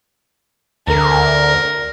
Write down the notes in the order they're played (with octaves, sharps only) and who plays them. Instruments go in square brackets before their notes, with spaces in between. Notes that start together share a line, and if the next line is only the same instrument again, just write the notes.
[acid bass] D2 [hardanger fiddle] A#4